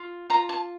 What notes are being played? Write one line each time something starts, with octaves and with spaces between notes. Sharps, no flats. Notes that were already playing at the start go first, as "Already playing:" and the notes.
Already playing: F4
F4 A#5
A5